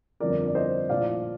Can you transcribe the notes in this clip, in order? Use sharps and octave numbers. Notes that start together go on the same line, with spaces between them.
G1 F2 D3 F3 A#4 D5
D5
C5 D#5
A#1 A2 F3 D5 F5